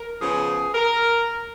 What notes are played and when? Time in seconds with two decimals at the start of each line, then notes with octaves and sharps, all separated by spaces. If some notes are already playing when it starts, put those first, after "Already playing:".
Already playing: A#4
0.20 C#3 F3 B3 G#4
0.74 A#4